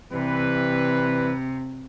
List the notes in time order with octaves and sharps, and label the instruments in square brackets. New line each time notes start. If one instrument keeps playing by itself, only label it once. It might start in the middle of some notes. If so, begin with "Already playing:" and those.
[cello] C3 [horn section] E3 G3 B4